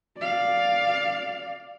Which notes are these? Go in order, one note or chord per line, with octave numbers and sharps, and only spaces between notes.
D5 F5